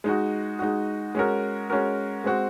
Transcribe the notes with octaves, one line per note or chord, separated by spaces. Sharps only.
G#3 D#4 F#4
G#3 D#4 F#4
G#3 C#4 F#4 A#4
G#3 C#4 F#4 A#4
G#3 C4 F#4